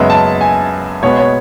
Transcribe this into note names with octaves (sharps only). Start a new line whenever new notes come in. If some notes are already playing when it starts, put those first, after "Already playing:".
Already playing: F#2 C#3 G#3 B3 E5
A5
G#5
B2 G#3 B3 C#5
C#5